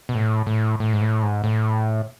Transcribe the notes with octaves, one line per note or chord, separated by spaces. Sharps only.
B2
A2
A2
A2
G#2
A2
G#2
A2